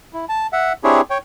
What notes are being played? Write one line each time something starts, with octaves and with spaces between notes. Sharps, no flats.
E4
A5
E5 F#5
C4 D4 E4 G4 G#4 C#5
C#5 G5